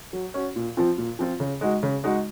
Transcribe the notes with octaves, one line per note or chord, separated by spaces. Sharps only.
F#3
C#4 F#4
A#2
F3 C4 F4
A#2
F3 C4 F4
C#3
G#3 D#4 F#4
C#3
G#3 D#4 F#4